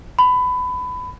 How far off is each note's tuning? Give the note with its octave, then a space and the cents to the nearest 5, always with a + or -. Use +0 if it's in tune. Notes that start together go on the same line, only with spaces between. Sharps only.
B5 +20